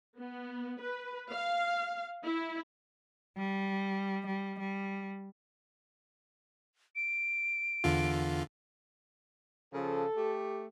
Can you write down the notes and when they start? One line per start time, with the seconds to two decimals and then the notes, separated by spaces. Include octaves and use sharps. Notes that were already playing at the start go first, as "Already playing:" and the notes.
0.18 B3
0.82 B4
1.31 F5
2.24 E4
3.37 G3
4.27 G3
4.59 G3
6.96 D7
7.84 E2 D3 F4
9.74 C#3 F3 A4
10.17 A3 G4